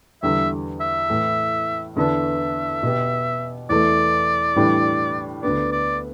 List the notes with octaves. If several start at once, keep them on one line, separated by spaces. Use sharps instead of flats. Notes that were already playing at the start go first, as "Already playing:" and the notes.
E2 D3 G3 E5
E5
A2 E3 A3
E2 D3 B3 D4 A4 E5
B2 B3 G4
E2 E3 A3 D5
A2 E3 G3 D4 G4
D2 D3 B3 D5
D5